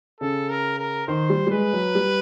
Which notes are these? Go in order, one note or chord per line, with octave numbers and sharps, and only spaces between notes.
C#3 A4
A#4
A#4
D#3 C5
G3
G3
G#3 B4
F#3
G3